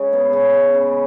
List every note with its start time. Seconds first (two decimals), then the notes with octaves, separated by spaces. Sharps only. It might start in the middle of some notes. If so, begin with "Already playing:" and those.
Already playing: C#3 G#3
0.13 B3
0.33 C#3
0.54 G#3
0.74 C#3